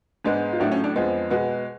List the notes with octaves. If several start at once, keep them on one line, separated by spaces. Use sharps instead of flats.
G#2 G#3 B3 D4
F4
A2 F#3 A3 D4
C#4
D4
F2 F3 G#3 B3
B2 G#3 B3 F#4